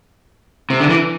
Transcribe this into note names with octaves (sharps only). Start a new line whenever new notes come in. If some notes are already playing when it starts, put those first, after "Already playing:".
C3
D3
E3